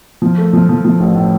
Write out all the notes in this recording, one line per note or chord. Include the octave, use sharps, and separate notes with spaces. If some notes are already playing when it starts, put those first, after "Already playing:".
F3
A3
F3
F3
F3
A1
A2